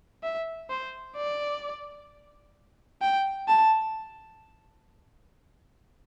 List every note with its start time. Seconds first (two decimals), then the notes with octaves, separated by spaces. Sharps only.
0.23 E5
0.69 C5
1.16 D5
3.02 G5
3.48 A5